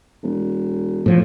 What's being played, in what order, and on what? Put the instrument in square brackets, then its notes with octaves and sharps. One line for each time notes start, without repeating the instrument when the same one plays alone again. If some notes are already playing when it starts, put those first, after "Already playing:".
[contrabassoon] E1
[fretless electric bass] A2 F3